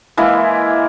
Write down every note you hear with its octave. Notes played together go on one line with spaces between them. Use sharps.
E3 G#3 A#3 E4